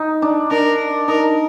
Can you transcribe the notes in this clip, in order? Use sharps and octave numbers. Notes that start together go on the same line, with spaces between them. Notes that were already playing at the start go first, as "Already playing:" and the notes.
Already playing: D#4
D4
D4 A#4
D#4 A#4